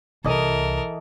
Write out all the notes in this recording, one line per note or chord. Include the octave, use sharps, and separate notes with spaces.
C2 E3 A4 A#4 D#5